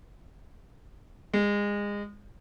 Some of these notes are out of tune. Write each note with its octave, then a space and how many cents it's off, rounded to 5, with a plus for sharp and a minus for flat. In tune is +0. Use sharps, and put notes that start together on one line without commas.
G#3 -25